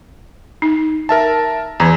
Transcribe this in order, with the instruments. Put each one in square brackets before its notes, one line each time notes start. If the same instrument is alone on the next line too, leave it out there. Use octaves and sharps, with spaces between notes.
[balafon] D#4
[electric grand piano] A#4 E5 A5
[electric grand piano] E2 [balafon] E3 A#5